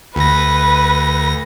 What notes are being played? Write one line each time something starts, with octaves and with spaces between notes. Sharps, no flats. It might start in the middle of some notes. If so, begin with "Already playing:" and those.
D2 B4 A#6